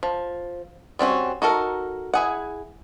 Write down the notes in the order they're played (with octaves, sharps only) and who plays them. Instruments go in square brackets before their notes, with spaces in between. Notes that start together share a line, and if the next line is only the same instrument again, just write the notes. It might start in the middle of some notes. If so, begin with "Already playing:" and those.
[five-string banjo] F3
G3 C4 C#4 F#4
D#4 F#4 A4 A#4
E4 G#4 F#5